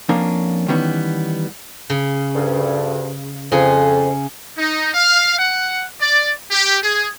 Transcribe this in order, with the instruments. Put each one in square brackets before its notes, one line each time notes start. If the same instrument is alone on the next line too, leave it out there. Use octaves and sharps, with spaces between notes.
[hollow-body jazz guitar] F2 A#3 C#4 D4
D#3 E3 G3 B3 C#4
[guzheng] C#3
[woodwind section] D2 G2
[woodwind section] F2 [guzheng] C#3 G#4
[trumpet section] D#4
F5
F#5
D5
G4
G#4